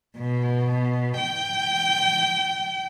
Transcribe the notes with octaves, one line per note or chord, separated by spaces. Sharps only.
B2
G5